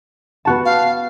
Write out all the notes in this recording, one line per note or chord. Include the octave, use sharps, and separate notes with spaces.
B3 F#4 A5
F5